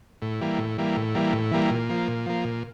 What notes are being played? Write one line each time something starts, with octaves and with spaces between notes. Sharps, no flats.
A2
E3 G3 A#3
A2
E3 G3 A#3
A2
E3 G3 A#3
A2
E3 G3 A#3
A#2
F3 A#3
A#2
F3 A#3
A#2